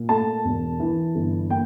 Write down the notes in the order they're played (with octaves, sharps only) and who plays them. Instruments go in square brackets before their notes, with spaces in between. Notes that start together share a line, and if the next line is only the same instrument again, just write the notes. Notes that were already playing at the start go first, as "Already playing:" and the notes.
Already playing: [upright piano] A#2
A3 A5
E1
E3
G1
A#3 G5